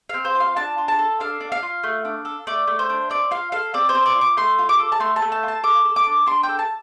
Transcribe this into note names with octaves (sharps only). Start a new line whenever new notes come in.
C4 F5
C5
F4
F5
D4 A5
F4
A5
A4
D4 F5
D4
F5
F4
A3
D4
A4
A3 D5
A3
C5
D4
C4 D5
F4 F5
A4 F5
C4 D5
C5
C4
D5
F4
D6
A3 C6
F4
D6
A4
A5
A3 C6
A5
A3
A5
F4
A5
A4 D6
A4
D6
D4
D4 C6
G5
A4
A5